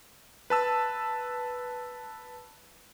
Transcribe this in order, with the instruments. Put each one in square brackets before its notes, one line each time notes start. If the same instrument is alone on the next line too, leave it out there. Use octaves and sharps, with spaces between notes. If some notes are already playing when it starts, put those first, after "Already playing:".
[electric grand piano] B4 A5 E6